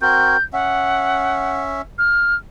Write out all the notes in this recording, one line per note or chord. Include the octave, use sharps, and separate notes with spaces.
C4 F#4 A#4 G6
C#4 E5 F#5
F6